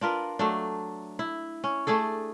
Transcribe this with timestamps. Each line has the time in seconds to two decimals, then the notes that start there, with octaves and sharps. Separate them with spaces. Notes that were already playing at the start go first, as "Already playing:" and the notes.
0.01 D4 F4 A#4 B4
0.39 F#3 A3 D4
1.19 E4
1.64 C#4
1.87 A3 D4 G#4 A4